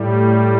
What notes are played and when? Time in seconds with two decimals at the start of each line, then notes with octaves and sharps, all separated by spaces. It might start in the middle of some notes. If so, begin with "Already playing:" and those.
Already playing: A2 G3